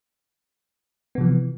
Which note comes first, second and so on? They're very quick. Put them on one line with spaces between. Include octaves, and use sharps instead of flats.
B3 C3 F3 E3